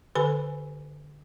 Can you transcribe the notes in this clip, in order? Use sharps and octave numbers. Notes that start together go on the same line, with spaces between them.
D3 G4 A4 B4 G#5 B5